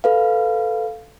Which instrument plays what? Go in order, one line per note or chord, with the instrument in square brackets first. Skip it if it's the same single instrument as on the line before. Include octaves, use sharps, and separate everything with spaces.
[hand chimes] A4 B4 F5